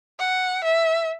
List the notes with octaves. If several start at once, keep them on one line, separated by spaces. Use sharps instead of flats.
F#5
E5